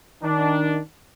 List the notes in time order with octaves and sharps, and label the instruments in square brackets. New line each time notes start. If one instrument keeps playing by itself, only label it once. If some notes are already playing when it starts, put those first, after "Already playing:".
[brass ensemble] D#3 D4